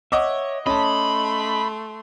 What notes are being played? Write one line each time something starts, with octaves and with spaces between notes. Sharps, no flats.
C#5 D#5 E5 F#5 D6
A3 C#4 D#5 A5 B5 C6